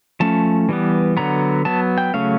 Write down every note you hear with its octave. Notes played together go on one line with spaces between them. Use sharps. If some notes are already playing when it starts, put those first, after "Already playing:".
F3 A3 C#4 A5
E3 G3 B3
D3 F#3 B3 A#5
F#3 B3 A5
G5
C#3 F#3 A3 C#4 F5